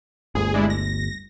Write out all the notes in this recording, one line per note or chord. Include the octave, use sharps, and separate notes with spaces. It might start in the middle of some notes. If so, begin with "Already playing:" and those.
G1 D2 G#4
G#3 D4 E4
A#6